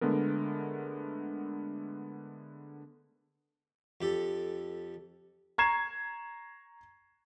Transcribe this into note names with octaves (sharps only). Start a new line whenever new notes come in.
D3 G#3 A3 B3 A#4
F2 G4 A4
A#5 C#6 G#6 C7 E7